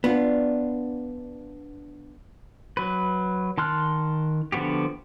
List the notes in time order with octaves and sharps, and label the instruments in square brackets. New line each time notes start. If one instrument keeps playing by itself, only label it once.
[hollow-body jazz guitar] B3 [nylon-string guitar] D4 F4
[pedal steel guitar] F#3 B4
D#3 A5 C6 F6 F#6
D3 F3 B3 F#4 G4